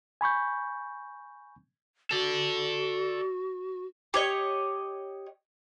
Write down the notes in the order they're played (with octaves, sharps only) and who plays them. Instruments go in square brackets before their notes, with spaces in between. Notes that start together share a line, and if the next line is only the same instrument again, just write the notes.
[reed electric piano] G#5 B5 C#6 G6
[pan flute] F#4 [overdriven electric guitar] A4 D5
[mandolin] G4 C#5 D#5